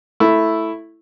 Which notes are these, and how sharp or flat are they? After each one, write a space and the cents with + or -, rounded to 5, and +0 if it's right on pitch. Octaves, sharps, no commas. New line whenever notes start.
A3 +0 E4 +0